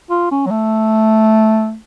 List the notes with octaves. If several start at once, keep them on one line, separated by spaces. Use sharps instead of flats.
F4
C#4
F#3
A3